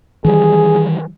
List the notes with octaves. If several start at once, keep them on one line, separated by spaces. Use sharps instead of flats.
D#3 E3 G3 G#4